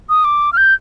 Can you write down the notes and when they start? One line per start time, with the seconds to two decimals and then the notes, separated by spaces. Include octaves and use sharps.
0.09 D#6
0.25 D6
0.53 F6
0.57 G6